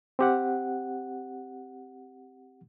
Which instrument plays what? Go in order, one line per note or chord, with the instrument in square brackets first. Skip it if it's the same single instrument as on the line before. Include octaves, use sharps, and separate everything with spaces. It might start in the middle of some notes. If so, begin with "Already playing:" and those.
[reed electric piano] C4 G4 F#5